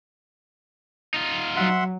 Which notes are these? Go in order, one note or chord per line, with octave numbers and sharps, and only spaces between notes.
D#4 F4
F#3 E5 F#5 C6